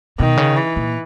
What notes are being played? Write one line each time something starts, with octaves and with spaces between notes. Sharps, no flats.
B2 D#3
C#3
E3
A#2